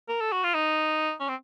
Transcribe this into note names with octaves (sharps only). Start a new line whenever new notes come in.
A#4
A4
F#4
F4
D#4
C#4
C4